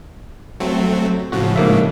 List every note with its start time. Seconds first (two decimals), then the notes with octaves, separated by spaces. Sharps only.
0.60 F#3 A3 C4
1.32 A2 C#3 F3 F#4
1.56 G#2 A#3 E5